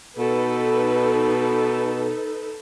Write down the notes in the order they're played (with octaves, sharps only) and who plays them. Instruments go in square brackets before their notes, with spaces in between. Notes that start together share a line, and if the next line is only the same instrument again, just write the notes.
[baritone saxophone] B2 [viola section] D#4 A4 B4